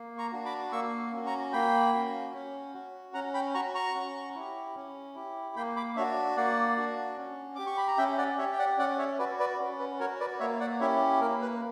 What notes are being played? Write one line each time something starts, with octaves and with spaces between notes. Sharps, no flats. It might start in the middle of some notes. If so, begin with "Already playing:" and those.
Already playing: A#3
A#5 C#6
D4 F#4
B5 D6
A#3 C#6 E6
C#4 F#4
A#5 C#6
A#3 G5 B5
C#4 F#4
C#4
F#4
C#4 F#5 A#5
G5 B5
F#4 A#5 C#6
A#5 C#6
C#4
E4 G4
C#4
E4 G4
A#3 G5 B5
B5 D6
D4 F#4 C#5 E5
A#3 D5 F#5
D4 F#4
C#4
G4 D6
C#6
B5
A#5
C#4 E5 G5
D5 F#5
G4 C#5 E5
G5
D5 F#5
C#4 D5 F#5
C#5 E5
F#4 B4 D5
B4 D5
C#4
B4
F#4 A#4 C#5
B4 D5
A#3 C#5 E5
D5 F#5
C#4 E4 G4 C#5 E5
A#3 A#4
B4